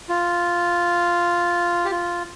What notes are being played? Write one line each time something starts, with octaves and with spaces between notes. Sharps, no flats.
F4
G4
F4